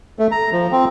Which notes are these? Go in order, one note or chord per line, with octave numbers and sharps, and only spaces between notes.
A3
A#5
F3
C4